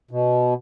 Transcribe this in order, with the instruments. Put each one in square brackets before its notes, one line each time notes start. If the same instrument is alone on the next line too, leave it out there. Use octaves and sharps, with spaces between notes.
[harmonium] B2